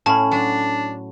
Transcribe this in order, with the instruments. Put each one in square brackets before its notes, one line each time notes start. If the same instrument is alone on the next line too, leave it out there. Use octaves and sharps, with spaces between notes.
[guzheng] A2 C#4 F5 [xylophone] A5 B5
[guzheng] F#3 [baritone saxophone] D4